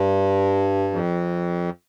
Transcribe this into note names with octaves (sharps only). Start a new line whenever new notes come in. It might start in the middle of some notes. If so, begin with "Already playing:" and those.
Already playing: G2
F2